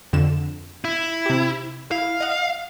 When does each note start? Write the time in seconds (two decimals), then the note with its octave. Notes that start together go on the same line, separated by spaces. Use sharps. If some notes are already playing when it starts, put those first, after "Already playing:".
0.13 F2 D3 E7
0.85 E4
1.26 C3 G4
1.91 E4 F5
2.21 D#5 F#5